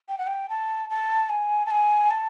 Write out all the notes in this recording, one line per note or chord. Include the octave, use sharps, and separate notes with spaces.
G5
F#5
G5
A5
A5
G#5
A5
G#5
A5